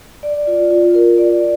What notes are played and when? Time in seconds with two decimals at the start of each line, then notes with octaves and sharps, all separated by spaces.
0.23 D5
0.47 F4
0.71 F4
0.94 A#4
1.18 D5